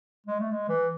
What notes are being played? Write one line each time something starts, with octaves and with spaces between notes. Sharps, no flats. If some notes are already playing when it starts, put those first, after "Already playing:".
G#3
A3
G#3
E3